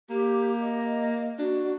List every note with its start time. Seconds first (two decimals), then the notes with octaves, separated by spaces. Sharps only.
0.10 A#3 G4
0.61 D#5
1.38 D4 F#4